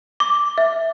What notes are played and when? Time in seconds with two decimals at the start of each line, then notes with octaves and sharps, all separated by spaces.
0.20 D6
0.58 E5